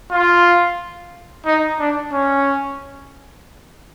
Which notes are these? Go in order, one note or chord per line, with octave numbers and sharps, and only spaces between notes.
F4
D#4
D4
C#4